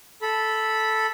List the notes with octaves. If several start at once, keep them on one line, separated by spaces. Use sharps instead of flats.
A4 B5